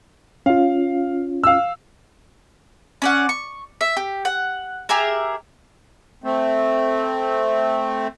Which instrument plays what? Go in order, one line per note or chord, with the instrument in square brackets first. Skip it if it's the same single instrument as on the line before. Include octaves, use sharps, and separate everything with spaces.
[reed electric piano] C#4 F4 [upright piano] F5
[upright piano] F5 E6
[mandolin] C#4 D5 F#5
C#6
E5
G4
F#5
G4 G#4 A#4 E5
[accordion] A3 C4